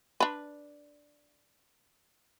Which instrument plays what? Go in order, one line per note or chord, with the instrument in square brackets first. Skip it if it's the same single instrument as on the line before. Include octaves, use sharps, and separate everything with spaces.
[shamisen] D4 B4